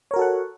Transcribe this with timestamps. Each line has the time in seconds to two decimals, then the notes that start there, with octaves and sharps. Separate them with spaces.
0.11 C#5
0.14 A#4
0.16 F#4
0.19 A4
0.22 F#5